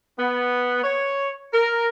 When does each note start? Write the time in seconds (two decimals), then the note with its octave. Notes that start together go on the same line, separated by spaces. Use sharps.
0.19 B3
0.83 C#5
1.53 A#4